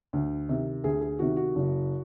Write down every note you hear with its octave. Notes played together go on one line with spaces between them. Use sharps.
D2
C3 D#3
D2 G#4
G#4
C3 D#3 F#4
F#4
F#1